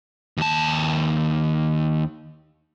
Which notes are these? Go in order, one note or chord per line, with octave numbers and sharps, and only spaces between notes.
D#2 A5